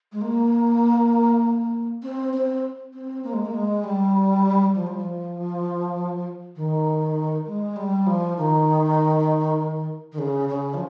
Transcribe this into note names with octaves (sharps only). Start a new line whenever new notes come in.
G#3
A#3
C4
C4
C4
A#3
G#3
A#3
G#3
G3
F3
G3
F3
D#3
G#3
G3
F3
D#3
D#3
C#3
C#3
F3